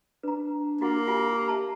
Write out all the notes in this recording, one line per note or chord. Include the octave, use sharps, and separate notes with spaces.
D4 B4 A#5
A#3 E4 F#4 F#5
F4 G4 F5 G#5
E5 A5 A#5